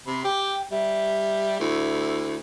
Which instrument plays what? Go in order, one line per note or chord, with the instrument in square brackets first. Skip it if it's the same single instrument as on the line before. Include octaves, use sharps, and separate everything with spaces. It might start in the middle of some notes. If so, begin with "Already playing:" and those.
[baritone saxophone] C3 [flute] B5
[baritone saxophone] G4 [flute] G5
[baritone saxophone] G3 [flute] E5
[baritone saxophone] D2 [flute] E4